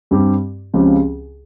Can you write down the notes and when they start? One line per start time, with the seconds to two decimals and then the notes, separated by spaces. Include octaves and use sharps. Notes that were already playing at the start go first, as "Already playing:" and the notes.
0.11 G2 G3 C4 G4
0.74 C#2 C#3 F3 C4 G4